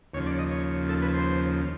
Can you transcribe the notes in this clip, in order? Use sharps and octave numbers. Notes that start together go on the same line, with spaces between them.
D#2 C#3 F3 C#5
D5
D#5
C#5
A4
B4
C5